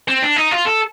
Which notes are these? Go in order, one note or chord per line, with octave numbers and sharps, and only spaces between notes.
C4
D4
D#4
F4
A4